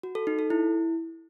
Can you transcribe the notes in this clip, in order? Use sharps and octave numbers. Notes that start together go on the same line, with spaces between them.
F#4
A4
D#4
A4
E4